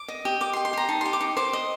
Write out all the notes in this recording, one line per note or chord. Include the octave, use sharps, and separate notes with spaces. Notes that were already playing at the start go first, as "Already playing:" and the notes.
Already playing: D6
D#5
G4
D#5 D6
C6
G4
C6
G4 A#5
D#4 A5
G4 C6
D6
D#4
C5 D6
D#5